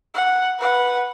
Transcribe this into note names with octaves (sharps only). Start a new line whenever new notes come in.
F#5
B4 F#5